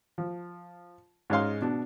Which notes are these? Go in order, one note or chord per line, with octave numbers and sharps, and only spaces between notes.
F3
G#2 G#3 C#4 F5 C6
B2 D4